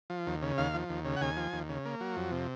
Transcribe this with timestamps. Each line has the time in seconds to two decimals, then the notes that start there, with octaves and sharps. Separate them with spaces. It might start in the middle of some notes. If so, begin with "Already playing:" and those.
0.10 F3
0.27 D#2
0.42 C#3
0.58 D#2 F5
0.74 F3
0.89 D#2
1.05 C#3
1.16 F#5
1.21 D#2 G#5
1.37 F3
1.52 D#2
1.69 C#3
1.85 A#3
2.01 F#3
2.17 F2
2.32 C3